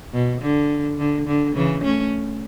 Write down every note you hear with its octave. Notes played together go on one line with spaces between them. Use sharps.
B2
D3
D3
D3
C#3 E3
A3 C#4